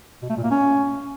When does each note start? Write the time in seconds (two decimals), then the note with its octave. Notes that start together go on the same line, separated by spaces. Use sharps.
0.23 B2
0.30 A3
0.37 A#2
0.44 A#3
0.51 C#4